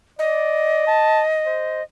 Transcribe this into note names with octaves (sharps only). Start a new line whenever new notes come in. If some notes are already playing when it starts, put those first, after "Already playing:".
D5 D#5
A5
C5